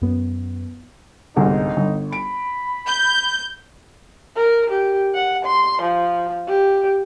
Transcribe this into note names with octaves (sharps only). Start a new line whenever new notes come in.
F#2 B3
G1 C2 G#2 D#4
G1
B5 D7
G6
A#4
G4
F#5
C6
F3
G4